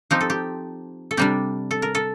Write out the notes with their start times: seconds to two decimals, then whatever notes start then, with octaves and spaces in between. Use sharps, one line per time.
0.11 F3 C4 D#4 G4
0.21 A4
0.30 G4
1.11 A4
1.17 C3 G3 D4 G4
1.71 A4
1.82 A#4
1.95 A4